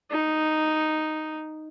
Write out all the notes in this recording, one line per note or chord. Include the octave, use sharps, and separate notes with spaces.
D#4